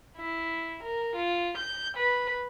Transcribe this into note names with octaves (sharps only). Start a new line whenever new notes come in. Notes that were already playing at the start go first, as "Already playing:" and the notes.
E4
A#4
F4
G6
B4